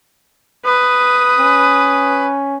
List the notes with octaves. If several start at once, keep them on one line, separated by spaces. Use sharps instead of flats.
B4 D#6
C#4